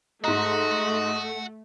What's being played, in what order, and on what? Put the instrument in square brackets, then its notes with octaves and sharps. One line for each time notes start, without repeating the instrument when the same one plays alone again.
[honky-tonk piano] G#2 A#5 [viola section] A3 [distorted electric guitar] F#4 [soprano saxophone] D#5